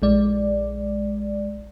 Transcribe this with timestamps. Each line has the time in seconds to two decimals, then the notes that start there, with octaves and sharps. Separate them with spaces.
0.02 A#1 G#3 D5